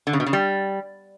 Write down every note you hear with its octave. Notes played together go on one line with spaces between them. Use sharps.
D3
C#3
B2
C#3
G3